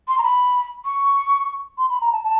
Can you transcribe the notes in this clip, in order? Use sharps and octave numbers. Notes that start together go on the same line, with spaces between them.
C6
A#5
B5
C#6
C6
B5
A#5
A5
A5